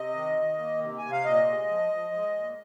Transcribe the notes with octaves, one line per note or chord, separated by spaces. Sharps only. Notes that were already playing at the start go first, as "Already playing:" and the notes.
Already playing: C3 D#5
D#3
D#3
A#3
C3
C3 G#5
F5
A#2 D#5
G#3
F3
F3
G#3
A#2